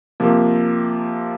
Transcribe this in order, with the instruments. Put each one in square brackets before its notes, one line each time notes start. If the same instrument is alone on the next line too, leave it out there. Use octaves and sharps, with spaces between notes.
[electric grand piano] C3 F3 A#3